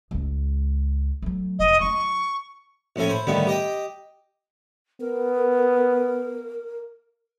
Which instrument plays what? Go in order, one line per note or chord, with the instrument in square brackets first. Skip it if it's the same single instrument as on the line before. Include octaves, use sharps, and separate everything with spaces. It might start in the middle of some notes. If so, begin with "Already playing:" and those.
[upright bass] C#2 G#3
F#3 A3
[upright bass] F1 [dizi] D#5
[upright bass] F#3 E4 [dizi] C#6
[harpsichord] A#1 A2 C#4 A4 G#5
C5 B5
A2 D3 D#3 G3 B3
G4 D#5 G5
[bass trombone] B3 [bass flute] A#4